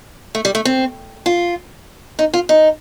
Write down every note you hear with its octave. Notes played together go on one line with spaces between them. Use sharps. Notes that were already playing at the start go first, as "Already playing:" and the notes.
A3
G3
A3
C4
F4
D#4
F4
D#4